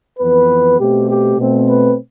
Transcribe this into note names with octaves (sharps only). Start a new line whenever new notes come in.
F2 E3 B3 B4
B2 A3 C4 G4
G4
B2 A3 C4
B4